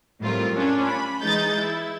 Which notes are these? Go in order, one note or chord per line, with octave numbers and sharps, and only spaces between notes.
A2 F#3 G3 C4 F4 A#4
C#4 D4 F4 C#5
B5
E3 G#3 D#4 G6 A6
E4